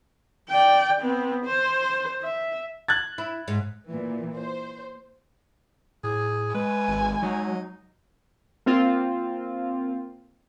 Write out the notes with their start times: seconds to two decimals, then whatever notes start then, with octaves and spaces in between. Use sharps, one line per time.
0.50 D5 G5
1.01 B3 C4
1.45 C5
2.22 E5
2.88 F#6 G#6 A6
3.18 E4
3.48 G#2
3.88 A#2 E3
4.37 C5
6.04 A2 G#4
6.55 G#3 B4 G#5
6.88 G#1
7.23 F#3 D#4
8.66 A#3 C4 F4